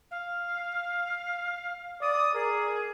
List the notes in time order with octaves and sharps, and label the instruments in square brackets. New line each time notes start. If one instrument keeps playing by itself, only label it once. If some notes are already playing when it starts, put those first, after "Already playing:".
[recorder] F5
[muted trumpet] D5 [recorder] D#6
[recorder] G#4 [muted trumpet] A#4